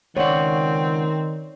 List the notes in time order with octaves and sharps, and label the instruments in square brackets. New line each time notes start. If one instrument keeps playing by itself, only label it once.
[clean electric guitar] C#2 F#5 [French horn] D#3 [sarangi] C4 [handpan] C#5 D5